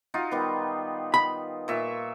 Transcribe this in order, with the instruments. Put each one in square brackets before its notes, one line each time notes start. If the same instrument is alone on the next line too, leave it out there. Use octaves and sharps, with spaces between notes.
[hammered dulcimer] D#4 F4 F#4
D#3 G3 B3
[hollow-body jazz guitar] B5
[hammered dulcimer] A#2 E5 C#6